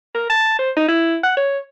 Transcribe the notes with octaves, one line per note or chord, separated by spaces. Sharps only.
A#4
A5
C5
D#4
E4
F#5
C#5